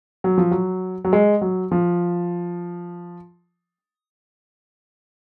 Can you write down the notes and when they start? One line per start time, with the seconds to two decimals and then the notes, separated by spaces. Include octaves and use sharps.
0.24 F#3
0.38 F3
0.51 F#3
1.05 F#3
1.13 G#3
1.41 F#3
1.72 F3